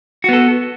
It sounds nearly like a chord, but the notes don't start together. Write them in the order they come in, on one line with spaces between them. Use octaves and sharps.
F#4 B3 A4